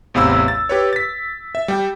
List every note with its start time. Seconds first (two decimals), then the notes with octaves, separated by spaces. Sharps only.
0.14 A1 E2 C3 F5 B5 E6
0.48 A6
0.69 G4 B4 C#5
0.93 A6 B6
1.55 E5
1.68 G3 G5